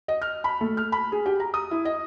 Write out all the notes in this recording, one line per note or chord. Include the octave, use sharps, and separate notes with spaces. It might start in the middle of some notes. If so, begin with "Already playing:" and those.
D#5
F6
B5
A3
F6
B5
G#4
G4
A#5
D#6
E4
D#5